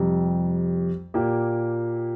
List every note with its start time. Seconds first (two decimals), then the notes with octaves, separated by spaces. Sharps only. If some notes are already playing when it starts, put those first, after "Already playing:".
Already playing: F2 C3 G3
1.14 A#2 A#3 G4